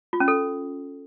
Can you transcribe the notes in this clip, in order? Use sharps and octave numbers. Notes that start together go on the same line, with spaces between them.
F4
C#4
A4